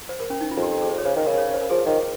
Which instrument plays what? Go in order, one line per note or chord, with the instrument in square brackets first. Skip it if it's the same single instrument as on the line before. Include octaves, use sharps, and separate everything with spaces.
[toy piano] C5
A#4
C#4
D#4
F4
[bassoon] F2
[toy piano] G4
G4
G#4
C5
C#5
[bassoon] C#3 [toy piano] C5
[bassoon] D#3
[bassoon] C#3 [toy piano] A#4
[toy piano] C#5
C5
A#4
[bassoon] F3 [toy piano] G#4
[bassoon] D#3